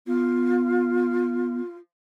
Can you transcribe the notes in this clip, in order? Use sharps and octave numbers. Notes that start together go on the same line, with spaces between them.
B3 F4